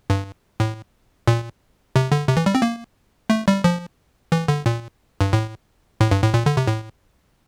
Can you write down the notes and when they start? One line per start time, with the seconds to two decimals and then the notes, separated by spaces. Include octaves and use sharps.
0.10 G2
0.60 A2
1.28 A#2
1.96 C3
2.12 D3
2.28 C3
2.37 E3
2.46 G3
2.55 C4
2.62 A#3
3.30 A3
3.48 G3
3.64 F3
4.32 E3
4.48 D3
4.66 A#2
5.21 G2
5.33 A2
6.01 A2
6.11 G2
6.23 A2
6.34 A#2
6.46 D3
6.57 C3
6.67 A2